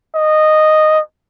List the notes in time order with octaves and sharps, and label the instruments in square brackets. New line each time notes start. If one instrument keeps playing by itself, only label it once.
[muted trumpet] D#5